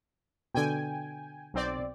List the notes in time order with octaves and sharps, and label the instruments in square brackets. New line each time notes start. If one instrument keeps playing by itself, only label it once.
[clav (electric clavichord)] B2 D3 [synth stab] G5 G#5
[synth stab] B1 C4 D5